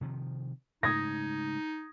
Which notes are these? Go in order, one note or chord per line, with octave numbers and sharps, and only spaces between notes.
C3 D#3 F3
G#2 C#3 A3 D#4 D#6 G#6 A#6